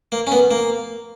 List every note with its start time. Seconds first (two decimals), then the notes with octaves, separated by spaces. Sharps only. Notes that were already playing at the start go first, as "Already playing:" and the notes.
0.12 A#3
0.27 C#4
0.32 B3
0.51 A#3